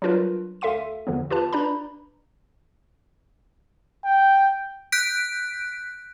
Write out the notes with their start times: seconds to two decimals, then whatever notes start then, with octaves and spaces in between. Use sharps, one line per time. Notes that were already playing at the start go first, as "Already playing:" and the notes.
0.02 F#3 G3 D4 F4 A#4 B4
0.61 D2 A4 E5 F5 C6 D#7
1.07 E2 D3 F3 B3
1.31 F4 G4 B4 A5
1.53 D4 B4 D5 A#5 B5
4.05 G5
4.92 F#6 G6 B6 D7